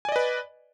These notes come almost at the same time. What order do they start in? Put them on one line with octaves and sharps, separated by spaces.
G#5 D5 D#5 B4